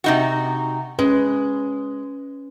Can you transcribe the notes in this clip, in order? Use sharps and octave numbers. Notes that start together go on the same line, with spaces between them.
C3 D#4 F#4
G#3 C#4 B4